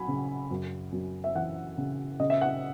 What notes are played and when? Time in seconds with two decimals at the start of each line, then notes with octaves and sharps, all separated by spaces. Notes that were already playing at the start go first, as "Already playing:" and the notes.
Already playing: F#3 G#5 B5
0.08 C#3
0.51 F#2
0.92 F#2
1.24 E5
1.35 E3 F#5
1.78 C#3
2.20 C#3 D#5
2.30 E5
2.41 F#5